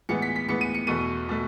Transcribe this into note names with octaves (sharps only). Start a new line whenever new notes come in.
A2 E3 G#3 B3 C#7
B6
B6
A2 E3 G#3 B3 C#7
D#7
C#7
E2 B2 A3 D#7
B2 A3